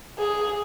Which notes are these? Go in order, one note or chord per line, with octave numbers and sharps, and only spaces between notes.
G#4